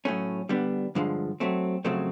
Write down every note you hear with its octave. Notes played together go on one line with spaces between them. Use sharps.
A2 F#3 A3 C#4
D3 G3 B3 D4
G2 D3 F3 G#3
F#3 A3 C4
F2 C#3 F#3 A3 C4